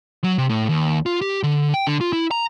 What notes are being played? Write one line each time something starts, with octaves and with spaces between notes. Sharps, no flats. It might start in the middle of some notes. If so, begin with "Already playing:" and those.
F#3
C3
A2
D#2
F4
G4
D3
G5
D3
F4
E4
A#5